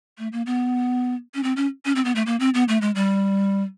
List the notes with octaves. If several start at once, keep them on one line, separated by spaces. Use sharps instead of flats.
A3
A#3
B3
C#4
C4
C#4
C#4
C4
B3
A3
A#3
C4
B3
A3
G#3
G3